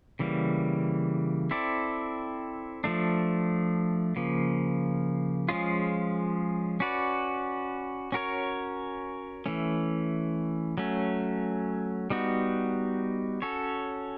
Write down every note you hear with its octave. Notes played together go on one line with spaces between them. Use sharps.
C#3 E3 G3 A#3
C4 E4 A4 D5
F3 A3 D4
C#3 F3 A#3
F3 G#3 C#4 F4 G#4
C#4 F#4 B4 D5
C#4 F#4 A#4 C#5
E3 A3 C#4
F#3 A3 C#4
G3 B3 D#4 F#4
C#4 F#4 A4 C#5